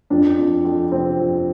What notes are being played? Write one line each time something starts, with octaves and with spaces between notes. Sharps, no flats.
F2 D4
F2
F2
C3 C4
F2